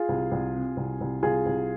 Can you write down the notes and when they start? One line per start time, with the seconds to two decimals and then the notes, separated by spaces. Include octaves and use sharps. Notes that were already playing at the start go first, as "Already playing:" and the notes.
Already playing: F4 G#4
0.09 C2
0.31 C2
0.54 C3
0.77 C2
1.01 C2
1.22 C2 F4 G#4
1.46 C2